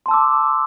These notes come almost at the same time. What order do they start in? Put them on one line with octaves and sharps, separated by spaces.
C6 A5 E6 D6